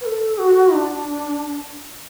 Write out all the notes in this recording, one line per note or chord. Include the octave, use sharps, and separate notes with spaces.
B4
A4
F#4
D4